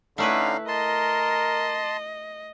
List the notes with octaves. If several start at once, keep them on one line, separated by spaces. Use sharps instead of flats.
D3 A3 C#4 D#4 E4 B4 F5
A#4 D#5 A5 C6